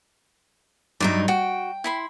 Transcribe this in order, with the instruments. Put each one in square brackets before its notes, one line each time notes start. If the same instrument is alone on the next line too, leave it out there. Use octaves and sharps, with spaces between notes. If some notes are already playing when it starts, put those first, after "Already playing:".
[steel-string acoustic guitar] G2 F#3 D#4 [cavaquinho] D5 E5
[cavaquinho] F#4 [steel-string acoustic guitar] G5
[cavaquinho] E4 B5 C6